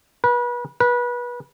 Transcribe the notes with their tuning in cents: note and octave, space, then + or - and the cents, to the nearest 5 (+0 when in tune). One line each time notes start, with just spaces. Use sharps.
B4 -30
B4 -25